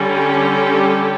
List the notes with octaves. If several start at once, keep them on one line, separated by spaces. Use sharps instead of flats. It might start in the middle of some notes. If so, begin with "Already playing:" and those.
Already playing: D3 G3 C#4
G4